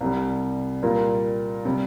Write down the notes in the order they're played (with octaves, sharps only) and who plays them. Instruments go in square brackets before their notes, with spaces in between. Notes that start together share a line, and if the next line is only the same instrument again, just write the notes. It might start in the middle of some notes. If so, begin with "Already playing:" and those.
[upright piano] C2 C3 G3
A#2 G3 A#3 F4 A#4
C3 G3